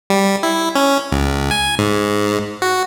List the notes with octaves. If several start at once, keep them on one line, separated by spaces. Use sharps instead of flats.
G3
E4
C#4
C#2
G#5
G#2
F#4